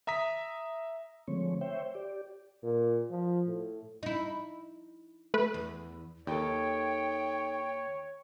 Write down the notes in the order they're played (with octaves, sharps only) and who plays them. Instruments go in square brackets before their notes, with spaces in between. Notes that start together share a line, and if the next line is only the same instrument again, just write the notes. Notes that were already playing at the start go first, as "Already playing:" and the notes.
[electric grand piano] E5 A#5 D#6 B6
[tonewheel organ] D3 F3 G#3 A3 C4 C#5
C5 C#5 E5 G5
G4 D5
[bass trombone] A#2
F3
A2
[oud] D#4 E4
[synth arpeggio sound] A3 B4
[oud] E2
[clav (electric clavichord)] D#2 [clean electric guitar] D#4 A4 [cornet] C#5 [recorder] G5